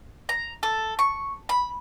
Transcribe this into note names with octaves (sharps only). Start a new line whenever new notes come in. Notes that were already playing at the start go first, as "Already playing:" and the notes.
A#5
A4
C#6
B5